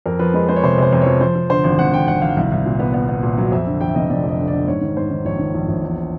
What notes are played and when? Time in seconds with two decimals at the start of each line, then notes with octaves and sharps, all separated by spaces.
0.06 F2 A#4
0.19 F3 B4
0.34 G#3 B4
0.49 G#3 C5
0.56 C#5
0.63 C3 C5
0.78 C3 C5
0.93 F2
1.02 F3 C#5
1.21 F3 C5
1.35 F3
1.50 D3 C5
1.64 G#1
1.79 G#1 F#5
1.93 D3 G5
2.08 G#1 F#5
2.21 G#1 F5
2.37 C2
2.52 C2
2.66 A#2
2.80 B3
2.94 B3
3.09 B3
3.23 A#2
3.38 F#3
3.52 F2 E5
3.67 D3
3.81 F2 G5
3.88 E5
3.95 F1 D#5
4.10 F1 D5
4.24 F2
4.29 D#5
4.38 D3
4.48 D5
4.53 D3
4.68 G#2 C#5
4.81 D#3
4.97 G#2 C5
5.10 D#3
5.25 A#1 C#5
5.39 D#3
5.54 A#1
5.68 A#1
5.83 E2